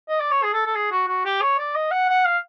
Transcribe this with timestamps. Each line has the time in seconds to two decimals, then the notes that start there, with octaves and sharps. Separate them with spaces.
0.09 D#5
0.20 D5
0.31 C#5
0.43 G#4
0.53 A4
0.66 A4
0.75 G#4
0.92 F#4
1.08 F#4
1.25 G4
1.42 C#5
1.58 D5
1.75 D#5
1.91 F#5
2.09 F#5
2.25 F5